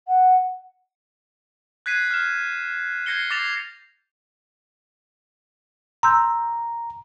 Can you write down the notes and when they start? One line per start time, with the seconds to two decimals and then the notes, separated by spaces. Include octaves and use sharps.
0.07 F#5
1.86 F#6 G#6 B6 C7 D#7
2.11 F6 E7
3.06 G6 G#6 A#6 C7 C#7 G7
3.30 D6 A6 A#6 C7 E7 F7
6.03 A#5 C6 E6 G6